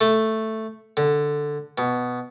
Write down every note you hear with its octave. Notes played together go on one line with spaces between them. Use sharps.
A3
D3
B2